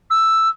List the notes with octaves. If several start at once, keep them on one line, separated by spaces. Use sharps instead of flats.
E6